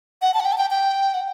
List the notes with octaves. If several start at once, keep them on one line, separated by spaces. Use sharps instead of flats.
F#5
A5
F#5
G5
A5
G5
G5
F#5